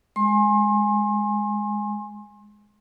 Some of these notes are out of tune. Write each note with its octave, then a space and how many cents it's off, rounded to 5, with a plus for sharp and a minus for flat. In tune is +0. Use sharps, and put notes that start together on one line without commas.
G#3 +5 G#5 +0 C6 +35